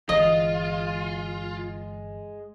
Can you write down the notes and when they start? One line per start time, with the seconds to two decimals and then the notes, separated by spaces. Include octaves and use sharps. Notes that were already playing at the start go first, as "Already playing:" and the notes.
0.09 G1 E3 G#3 F4 D#5